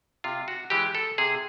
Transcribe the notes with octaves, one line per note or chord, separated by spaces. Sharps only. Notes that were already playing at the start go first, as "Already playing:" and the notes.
C3 F4
F#4
E3 G#3 G4
A4
C3 G#4